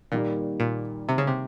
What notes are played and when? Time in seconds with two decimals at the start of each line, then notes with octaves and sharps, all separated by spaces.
0.11 A#2 D#3 G3 A#3
0.60 A#2
1.09 C3
1.18 C#3
1.27 C3